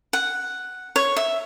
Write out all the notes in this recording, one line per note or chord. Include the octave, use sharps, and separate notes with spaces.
F#5
C#5
E5